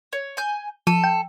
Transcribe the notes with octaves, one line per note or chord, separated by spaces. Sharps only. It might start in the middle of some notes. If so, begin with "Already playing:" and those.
C#5
G#5 G6
F3 A4 D#7
G5